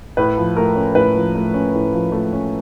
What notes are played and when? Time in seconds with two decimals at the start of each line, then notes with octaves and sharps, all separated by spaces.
0.17 A2 B4
0.37 F3
0.56 A3 A#4
0.76 C#4
0.95 A2 B4
1.15 F3
1.35 A3
1.54 C#4
1.74 A2
1.93 F3
2.12 A3
2.33 C#4